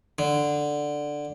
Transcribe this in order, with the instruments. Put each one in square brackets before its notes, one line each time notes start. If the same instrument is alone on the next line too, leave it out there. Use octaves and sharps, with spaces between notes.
[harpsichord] D3